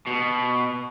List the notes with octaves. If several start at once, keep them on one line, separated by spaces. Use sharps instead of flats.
B2